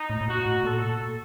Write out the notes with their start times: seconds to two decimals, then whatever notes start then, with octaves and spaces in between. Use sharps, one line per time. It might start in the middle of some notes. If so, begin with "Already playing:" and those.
Already playing: D#4
0.10 A2
0.21 A2
0.27 A#2 F#4
0.46 A2
0.64 A#2 A4
0.77 A2
0.90 A#2